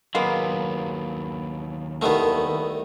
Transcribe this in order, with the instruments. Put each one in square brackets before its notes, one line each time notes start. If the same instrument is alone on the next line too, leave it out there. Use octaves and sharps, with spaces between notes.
[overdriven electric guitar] D#2 F#3 [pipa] G#3 A#3 B3
[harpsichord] C2 D#3 A3 [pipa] F3 B3